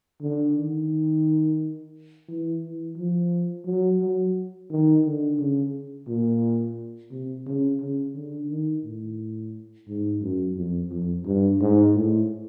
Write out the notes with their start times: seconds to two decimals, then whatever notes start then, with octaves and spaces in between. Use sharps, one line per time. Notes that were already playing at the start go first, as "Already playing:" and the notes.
0.21 D3
0.56 D#3
2.28 E3
2.63 E3
2.97 F3
3.66 F#3
4.01 F#3
4.70 D#3
5.05 D3
5.39 C#3
6.08 A#2
7.11 C3
7.47 C#3
7.81 C#3
8.15 D3
8.50 D#3
8.84 A2
9.88 G#2
10.22 F#2
10.57 F2
10.92 F2
11.26 G2
11.61 G#2
11.95 A2